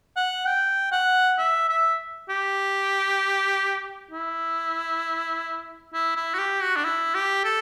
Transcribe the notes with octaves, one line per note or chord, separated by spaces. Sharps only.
F#5
G5
F#5
E5
E5
G4
E4
E4
E4
F#4
G4
F#4
D4
E4
G4
A4